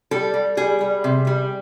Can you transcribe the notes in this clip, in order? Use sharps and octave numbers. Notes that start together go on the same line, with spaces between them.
G3 A4
G3
G3 G#4
G3
C3
G3